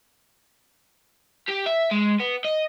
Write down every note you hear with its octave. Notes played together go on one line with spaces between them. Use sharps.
G4
E5
G#3
B3
D#5